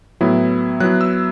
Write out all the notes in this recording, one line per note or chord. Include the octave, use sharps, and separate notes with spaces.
A2 F#3 B3 E4
F#3 B3 E4 F#6
E6